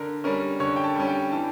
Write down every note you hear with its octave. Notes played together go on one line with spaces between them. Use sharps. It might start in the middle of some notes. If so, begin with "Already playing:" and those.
Already playing: D3 A#4
G3 C#4 A#4
D3 C#5
G5
A5
G3 C#4
G5
E3 A5